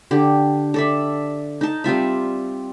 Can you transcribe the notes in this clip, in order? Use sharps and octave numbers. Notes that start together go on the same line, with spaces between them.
D3 G4
A4 D5 E5
D#4 A5
G3 C4 F4 E5